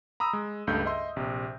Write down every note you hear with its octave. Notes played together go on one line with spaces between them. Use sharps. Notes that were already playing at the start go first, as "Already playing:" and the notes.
A#5 B5 D#6 E6
G#3
C#2 G2 A3 G6
D#5 E5 C6
A#1 C3